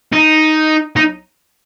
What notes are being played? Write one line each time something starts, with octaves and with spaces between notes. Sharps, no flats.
D#4
D#4